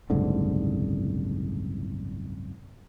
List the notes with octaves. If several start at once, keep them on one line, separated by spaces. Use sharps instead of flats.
F#1 C2 G#2 D3